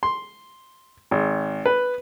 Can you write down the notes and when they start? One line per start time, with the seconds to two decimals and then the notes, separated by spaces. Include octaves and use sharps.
0.03 C6
1.11 G#1
1.66 B4